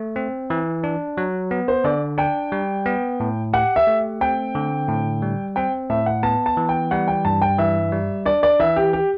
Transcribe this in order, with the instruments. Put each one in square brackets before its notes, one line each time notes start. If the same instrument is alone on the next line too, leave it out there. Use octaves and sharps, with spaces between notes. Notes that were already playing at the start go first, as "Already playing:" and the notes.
Already playing: [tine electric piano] A3
C4
E3
D4
F#3
B3
[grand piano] C5
[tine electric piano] D3 [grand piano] D5
[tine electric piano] D4 [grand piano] G5
[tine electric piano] G3
B3
A2
[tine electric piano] G4 [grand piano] F#5
[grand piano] E5
[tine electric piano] A3
[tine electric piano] C4 [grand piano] G5
[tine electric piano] D3
A2
G3
[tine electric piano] C4 [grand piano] G5
[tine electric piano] A2 [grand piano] E5
[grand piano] F#5
[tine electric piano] B3 [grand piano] A5
[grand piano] A5
[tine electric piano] E3
[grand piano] G5
[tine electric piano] G3 [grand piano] F#5
[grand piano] G5
[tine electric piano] G2 [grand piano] A5
[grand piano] G5
[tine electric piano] E3 [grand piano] E5
[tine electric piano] G3
[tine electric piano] D4 [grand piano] D5
[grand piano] D5
[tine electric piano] E3 [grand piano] E5
[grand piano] G4
G4